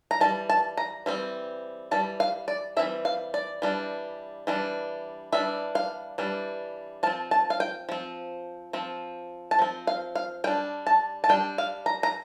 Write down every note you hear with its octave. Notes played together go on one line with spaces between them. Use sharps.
A#5
E3 G3 A5
A5
A#5
E3 G3 C4
E3 G3 A5
F5
D5
E3 G3 C4 E5
F5
D5
E3 G3 D4
E3 G3 D4
E3 G3 D4 E5
F5
E3 G3 D4
F3 C4 A5
A5
F5
G5
F3 C4
F3 C4
A5
F3 C4
F5
F5
G3 D4 G5
A5
A5
G3 D4 G5
F5
A#5
A#5